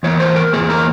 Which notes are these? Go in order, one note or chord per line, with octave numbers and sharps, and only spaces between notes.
E2 E3 A#3 C#5
C5
A#4
E2 E3 A#3 G#4
A#4